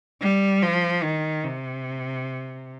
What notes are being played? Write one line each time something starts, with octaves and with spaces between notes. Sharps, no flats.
G3
F3
D#3
C3